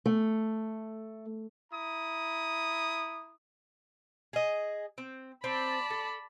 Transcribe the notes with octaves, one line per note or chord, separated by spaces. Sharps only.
A3
E4 A#5 D#6
G#4 D#5
C4
C4 D5 A5 B5
A4